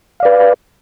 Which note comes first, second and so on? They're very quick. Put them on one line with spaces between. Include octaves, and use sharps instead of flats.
F5 D5 B4